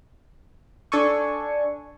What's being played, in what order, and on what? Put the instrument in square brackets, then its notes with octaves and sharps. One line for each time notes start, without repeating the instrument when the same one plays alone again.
[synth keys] D4 A4 G#5 C#6